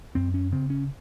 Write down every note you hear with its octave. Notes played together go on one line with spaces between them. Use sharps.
F#2 C4
C#4
C#3 C4
C#4